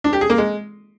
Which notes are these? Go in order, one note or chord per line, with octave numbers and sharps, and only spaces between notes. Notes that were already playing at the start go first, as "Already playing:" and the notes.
D4
G4
G#4
A#3
G#3